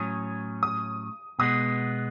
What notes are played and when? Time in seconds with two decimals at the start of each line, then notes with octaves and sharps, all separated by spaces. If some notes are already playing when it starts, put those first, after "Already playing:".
Already playing: A2 F#3 C#4 D#6
0.63 D#6
1.39 B2 G#3 B3 D#6